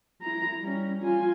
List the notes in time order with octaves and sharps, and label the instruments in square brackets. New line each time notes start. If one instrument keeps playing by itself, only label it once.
[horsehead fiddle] E4 A#5
G3 C#4
F4 G#5